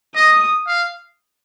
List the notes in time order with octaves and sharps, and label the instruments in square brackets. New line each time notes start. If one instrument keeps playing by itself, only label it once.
[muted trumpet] D#5 [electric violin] D#6
[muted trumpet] F5